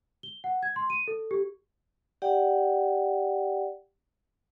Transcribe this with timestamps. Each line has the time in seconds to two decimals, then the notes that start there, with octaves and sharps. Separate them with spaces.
0.23 G7
0.44 F#5
0.63 G#6
0.76 C6
0.90 D#7
1.08 A4
1.31 G4
2.22 G4 D5 F#5 G5